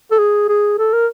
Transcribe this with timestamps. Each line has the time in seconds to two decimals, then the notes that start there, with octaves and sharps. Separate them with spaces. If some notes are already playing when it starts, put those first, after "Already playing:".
0.11 A4
0.19 G#4
0.49 G#4
0.78 A4
0.93 A#4